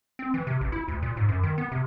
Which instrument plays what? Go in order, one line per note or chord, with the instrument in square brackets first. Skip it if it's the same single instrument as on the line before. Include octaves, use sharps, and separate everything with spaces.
[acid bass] C4
E3
C3
A1
E4
D2
A#2
G#2
F#2
D#3
B3
C3